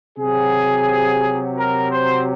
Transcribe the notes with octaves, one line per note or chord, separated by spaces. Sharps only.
C3 F#3 G#4
A#4
C5